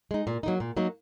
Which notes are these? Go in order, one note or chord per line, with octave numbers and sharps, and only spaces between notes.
G#3 D#4
A#2
F#3 A#3 D#4
A#2
F#3 A#3 D#4